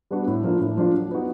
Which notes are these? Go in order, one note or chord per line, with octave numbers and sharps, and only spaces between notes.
G3 B3 D4 F#4
A2
F3 A#3 D4 F4
A2
F3 A#3 D4 F4
F#3
B3 D#4 F#4